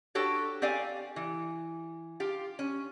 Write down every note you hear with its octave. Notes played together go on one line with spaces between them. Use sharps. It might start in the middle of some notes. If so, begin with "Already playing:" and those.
D4 F#4 G4 A4 C#5
C4 G4 D5 F5 G#5
E3
F4 G4
C#4